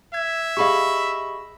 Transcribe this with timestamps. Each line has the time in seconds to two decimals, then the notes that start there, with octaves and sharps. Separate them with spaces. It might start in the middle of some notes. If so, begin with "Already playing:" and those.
0.14 E5 G#6
0.57 G4 G#4 D#5 F5 B5 C#6